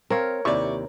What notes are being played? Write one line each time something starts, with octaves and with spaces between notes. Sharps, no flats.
C4 A#4 C#5 F5
D#2 C3 E4 D5 C#6